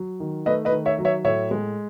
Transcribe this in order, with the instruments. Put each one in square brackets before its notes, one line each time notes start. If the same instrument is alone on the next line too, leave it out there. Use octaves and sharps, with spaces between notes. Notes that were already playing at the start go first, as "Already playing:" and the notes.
Already playing: [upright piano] F#3
D#3
A3 B4 D#5
B4 D#5
D#3
C#5 E5
F#3
C#5 E5
A2 C#5 E5
G#3